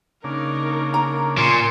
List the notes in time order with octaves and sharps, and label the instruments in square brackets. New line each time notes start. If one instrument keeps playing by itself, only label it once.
[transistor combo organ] C#3 A#3 D4 [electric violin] D#4 A#4
[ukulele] A#5
[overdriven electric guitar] A#2 [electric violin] G#5 C6